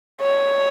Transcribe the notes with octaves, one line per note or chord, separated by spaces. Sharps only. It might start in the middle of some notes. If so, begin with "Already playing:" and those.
C#5